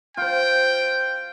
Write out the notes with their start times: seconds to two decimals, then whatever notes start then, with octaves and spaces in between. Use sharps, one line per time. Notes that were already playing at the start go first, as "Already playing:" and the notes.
0.17 F4 C5 G5